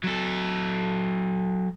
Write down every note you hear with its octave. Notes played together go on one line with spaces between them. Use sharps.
F#3 A4